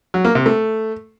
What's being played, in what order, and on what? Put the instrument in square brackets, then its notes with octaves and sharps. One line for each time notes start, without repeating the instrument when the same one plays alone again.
[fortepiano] F#3
A#3
C3
A3